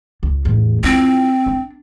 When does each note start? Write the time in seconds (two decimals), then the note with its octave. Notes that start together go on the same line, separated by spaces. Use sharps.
0.23 C#2
0.45 E2 A2
0.84 C4 E4 F4
1.46 D4